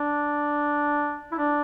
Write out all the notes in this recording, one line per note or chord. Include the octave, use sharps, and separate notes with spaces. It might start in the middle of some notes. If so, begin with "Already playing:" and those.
Already playing: D4
E4
D4